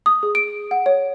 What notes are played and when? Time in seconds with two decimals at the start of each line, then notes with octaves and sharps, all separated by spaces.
0.06 D#6
0.23 G#4
0.35 D7
0.71 F#5
0.86 C#5